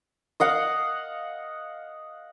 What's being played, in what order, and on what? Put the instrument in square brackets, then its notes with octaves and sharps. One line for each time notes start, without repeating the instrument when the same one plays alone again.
[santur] D#5 F5 F#5